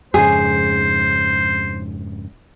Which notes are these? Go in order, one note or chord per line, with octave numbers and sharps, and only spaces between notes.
F2 G#2 C#3 G#4 C5